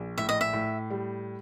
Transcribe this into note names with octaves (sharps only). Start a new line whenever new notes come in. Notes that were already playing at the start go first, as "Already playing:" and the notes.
Already playing: A#1
A2 E5
D#5
E5
A2
G3